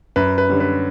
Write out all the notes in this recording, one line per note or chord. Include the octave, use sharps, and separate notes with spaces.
F#2 B4
B4
D3 G3 C#4
B4